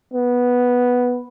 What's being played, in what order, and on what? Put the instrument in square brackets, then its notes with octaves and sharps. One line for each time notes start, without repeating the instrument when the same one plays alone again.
[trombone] B3